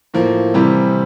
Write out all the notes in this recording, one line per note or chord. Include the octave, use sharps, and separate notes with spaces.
A2 F3 A#3
C3 E3 G3 C4